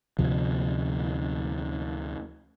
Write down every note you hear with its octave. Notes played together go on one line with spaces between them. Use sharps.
D2 C3 F3